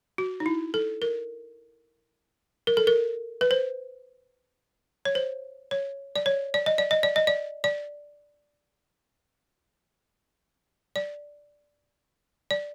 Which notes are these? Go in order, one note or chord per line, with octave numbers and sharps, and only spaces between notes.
F#4
D#4
E4
A4
A#4
A#4
A4
A#4
B4
C5
C#5
C5
C#5
D5
C#5
D5
D#5
D5
D#5
D5
D#5
D5
D5
D5
D5